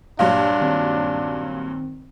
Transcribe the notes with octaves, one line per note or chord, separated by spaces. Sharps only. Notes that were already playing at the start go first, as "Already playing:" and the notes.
G2 A#2 F#3 D4 F5
D#3 C4